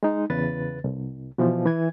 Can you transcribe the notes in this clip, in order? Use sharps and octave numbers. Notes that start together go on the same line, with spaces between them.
G#3 D#4
E2 C#3 B4 A6
C2
B2 E3 F3
E3 G#6